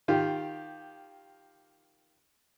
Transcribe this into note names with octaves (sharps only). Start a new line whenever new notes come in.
D#3 F4 G4